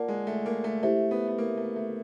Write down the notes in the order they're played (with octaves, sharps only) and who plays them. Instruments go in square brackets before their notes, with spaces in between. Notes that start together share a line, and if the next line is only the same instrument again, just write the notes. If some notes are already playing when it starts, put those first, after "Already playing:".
Already playing: [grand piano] A#3 [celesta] F4 A#4 D5 F#5 A5
[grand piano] G#3
A3
A#3
A3
[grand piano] A3 [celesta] E4 G4 C5 E5
[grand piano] B3
B3
A#3
A3
A3